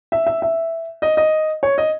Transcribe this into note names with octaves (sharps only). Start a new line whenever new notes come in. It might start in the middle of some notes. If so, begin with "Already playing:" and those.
E5
E5
E5
D#5
D#5
C#5
D#5